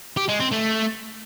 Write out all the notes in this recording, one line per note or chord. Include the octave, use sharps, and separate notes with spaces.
G4
G#3
C4
A3